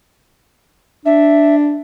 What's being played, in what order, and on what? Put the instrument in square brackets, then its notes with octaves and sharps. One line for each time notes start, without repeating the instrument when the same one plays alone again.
[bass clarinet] D4 [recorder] E5